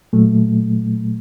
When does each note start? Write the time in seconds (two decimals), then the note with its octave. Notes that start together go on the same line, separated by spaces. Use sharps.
0.13 A#2 F#3 A3